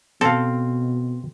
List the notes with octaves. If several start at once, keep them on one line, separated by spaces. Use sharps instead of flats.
B2 C4 A4 F5